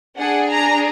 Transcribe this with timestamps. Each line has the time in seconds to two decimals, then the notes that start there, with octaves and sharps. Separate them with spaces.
0.18 D4 G#4 F#5
0.50 A#5